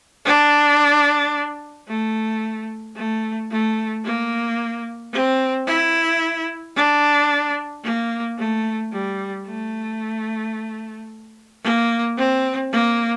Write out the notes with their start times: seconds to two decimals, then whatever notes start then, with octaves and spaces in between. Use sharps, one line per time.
0.25 D4
1.88 A3
2.96 A3
3.51 A3
4.04 A#3
5.13 C4
5.67 E4
6.76 D4
7.84 A#3
8.38 A3
8.92 G3
9.47 A3
11.63 A#3
12.17 C4
12.72 A#3